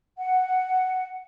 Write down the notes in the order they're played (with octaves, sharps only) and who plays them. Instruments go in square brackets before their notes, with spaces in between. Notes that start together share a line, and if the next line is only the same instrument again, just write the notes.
[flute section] F#5